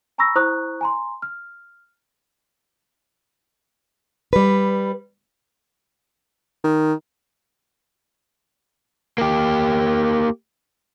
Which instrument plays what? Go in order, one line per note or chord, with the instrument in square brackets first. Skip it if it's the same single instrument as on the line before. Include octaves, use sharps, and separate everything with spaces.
[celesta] G#5 A#5 B5 C#6 E6 A#6
E4 C5 A#5 C#6 D#6 F#6
G#5 A#5 C6
F6
[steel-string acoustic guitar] G3 B4
[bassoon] D#3
[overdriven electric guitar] A#3 G4